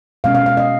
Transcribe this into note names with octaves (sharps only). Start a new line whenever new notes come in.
B2 G#3 C#4 F5
F5
F5
D#5